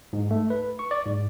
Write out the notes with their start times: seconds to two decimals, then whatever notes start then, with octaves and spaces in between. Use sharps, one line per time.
0.13 G#2
0.31 A3
0.50 B4
0.79 C#6
0.91 D5
1.06 G#2